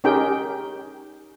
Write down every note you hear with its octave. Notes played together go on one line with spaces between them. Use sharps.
C#4 D#4 G4 G#4 A#4 G5